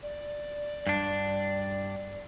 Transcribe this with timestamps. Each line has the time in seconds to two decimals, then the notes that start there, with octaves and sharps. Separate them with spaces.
0.03 D5
0.87 G2 D4